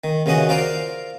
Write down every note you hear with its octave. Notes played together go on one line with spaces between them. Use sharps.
D#3
D#2 C#3 E3 F#4 D#5 F#5
F4 A#4 C5 D5 F5